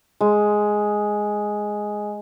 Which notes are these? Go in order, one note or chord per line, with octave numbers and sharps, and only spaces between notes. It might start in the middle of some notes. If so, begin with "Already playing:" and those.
G#3